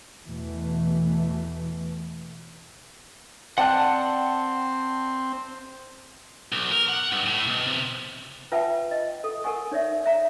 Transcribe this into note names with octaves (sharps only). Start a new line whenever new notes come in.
E2 B2 E3 A3
C4 D5 F#5 G5 A5 F#6
B1
A#4
F#5
G2
A2
B2
C3
F4 B4 E5 F#5 G5 A5
D#5
A4
A4 A#4 F#5 G#5 C#6
D#4 C#5 D5 E5
E5 A#5